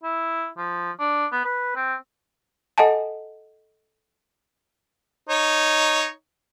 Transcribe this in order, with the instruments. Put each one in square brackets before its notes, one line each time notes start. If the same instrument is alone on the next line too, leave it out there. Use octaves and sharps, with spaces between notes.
[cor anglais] E4
F3
D4
B3
B4
C4
[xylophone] A4 D#5 F#5 G#5 A5
[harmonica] D#4 C#5